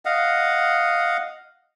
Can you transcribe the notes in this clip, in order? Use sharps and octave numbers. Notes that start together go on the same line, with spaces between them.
D#5 F5 F#5